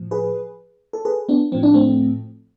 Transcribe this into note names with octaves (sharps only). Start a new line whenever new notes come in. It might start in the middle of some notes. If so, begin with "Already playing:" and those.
Already playing: A2 F3
G#4 B4
A4
G#4 B4
B3 D4
A2 F3 C4
D4
A3 C4